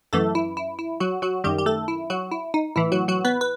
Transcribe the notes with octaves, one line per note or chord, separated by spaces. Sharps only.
F#2 E3 A3 A4
E4
E4
E4
F#3 F#4
F#3 F#4
F#2 D#3 G3 G4
G4
A3 A4
E4
F#3 F#4
E4
D#4
A2 E3 E4
F#3 F#4
F#3 F#4
B3 B4
B4